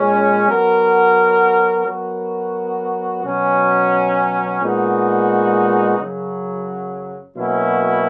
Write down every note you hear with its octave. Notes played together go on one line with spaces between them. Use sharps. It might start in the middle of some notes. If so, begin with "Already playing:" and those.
Already playing: A#2 G#3 C#4
F#3 B3 F#4 A#4
F#3 B3 F#4 A#4
B2 F#3 C#4
A#2 G#3 B3 D#4 F#4
F#2 C#3 F#3
B2 F#3 A#3 C#4 E4